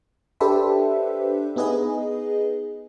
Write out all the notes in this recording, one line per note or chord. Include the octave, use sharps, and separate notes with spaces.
D4 G4 A4 B4 C5 E5
B3 D#4 G#4 B4 D#5